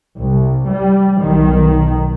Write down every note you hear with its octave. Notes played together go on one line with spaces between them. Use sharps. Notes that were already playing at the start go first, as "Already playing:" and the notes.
C2
G3
B1 D#3